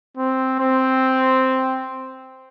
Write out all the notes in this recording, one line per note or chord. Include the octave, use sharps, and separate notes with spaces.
C4
C4